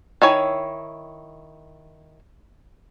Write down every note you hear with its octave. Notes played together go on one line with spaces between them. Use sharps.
D#3 E4 C#5 G#5